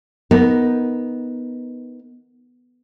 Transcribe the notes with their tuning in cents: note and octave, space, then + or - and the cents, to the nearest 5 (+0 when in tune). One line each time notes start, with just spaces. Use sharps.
B3 +0 D#4 +10 A#4 +0